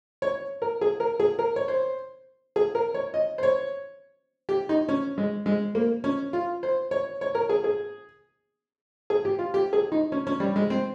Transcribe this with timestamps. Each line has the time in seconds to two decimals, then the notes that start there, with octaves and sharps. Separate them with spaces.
0.22 C#5
0.62 A#4
0.81 G#4
1.00 A#4
1.20 G#4
1.39 A#4
1.56 C#5
1.68 C5
2.56 G#4
2.75 A#4
2.94 C#5
3.14 D#5
3.38 C5
3.43 C#5
4.49 G4
4.69 D#4
4.89 C#4
5.18 G#3
5.46 G#3
5.75 A#3
6.04 C#4
6.33 F4
6.63 C5
6.91 C#5
7.21 C#5
7.35 A#4
7.49 G#4
7.64 G#4
9.10 G#4
9.25 G4
9.39 F4
9.54 G4
9.73 G#4
9.92 D#4
10.12 C#4
10.27 C#4
10.40 G3
10.56 G#3
10.70 C4